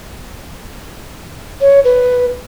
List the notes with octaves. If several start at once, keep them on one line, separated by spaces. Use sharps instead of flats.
C#5
B4